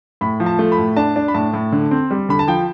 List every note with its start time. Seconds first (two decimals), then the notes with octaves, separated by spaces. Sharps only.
0.21 A2 B5
0.40 F3
0.46 A5
0.59 A3
0.72 B5
0.78 A2
0.97 D4 A5
1.16 D4
1.28 B5
1.34 A2 A5
1.54 A2
1.72 D3
1.91 C4
2.11 G3
2.29 D3 B5
2.39 A5
2.48 F3 G5